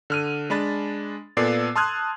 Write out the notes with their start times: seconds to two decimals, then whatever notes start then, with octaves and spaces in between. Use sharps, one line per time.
0.10 D3 F6 D#7
0.50 G#3 D4 B5 A6
1.37 A#2 B3 A4 D5 E6 C7
1.76 A5 C6 D#6 F6 F#6 G#6